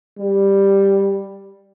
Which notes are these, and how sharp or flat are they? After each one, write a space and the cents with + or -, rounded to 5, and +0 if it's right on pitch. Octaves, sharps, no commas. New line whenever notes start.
G3 +5